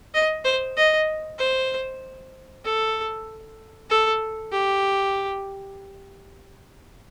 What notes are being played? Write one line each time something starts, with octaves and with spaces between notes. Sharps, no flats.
D#5
C5
D#5
C5
A4
A4
G4